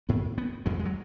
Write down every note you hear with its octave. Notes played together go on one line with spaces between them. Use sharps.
G#2 B3
B3
F2 G#3
G#3
F#3